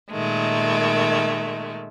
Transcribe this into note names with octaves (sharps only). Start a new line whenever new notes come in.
A#2 D#3 G#3 A3